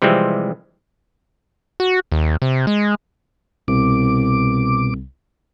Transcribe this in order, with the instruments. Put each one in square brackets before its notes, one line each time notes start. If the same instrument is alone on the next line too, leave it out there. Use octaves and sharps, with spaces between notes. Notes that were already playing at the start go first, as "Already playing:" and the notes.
[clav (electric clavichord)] C3 E3 F3 G3 G#3 C4
[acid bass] F#4
D#2
C3
G#3
[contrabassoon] C2 [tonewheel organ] B2 D6